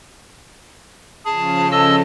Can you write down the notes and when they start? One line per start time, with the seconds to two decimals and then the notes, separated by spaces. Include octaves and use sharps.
1.25 C#3 F3 C#4 G#4 A5
1.72 A4 D#5 E6